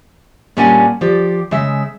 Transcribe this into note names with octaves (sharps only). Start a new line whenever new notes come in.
A#2 G3 C#4 D4 F#5 G#5
F3 G4 D5
C#3 G#3 E5